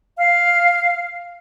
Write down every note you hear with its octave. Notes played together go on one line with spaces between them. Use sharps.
F5 F6